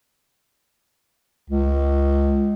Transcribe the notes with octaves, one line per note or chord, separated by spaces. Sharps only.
C#2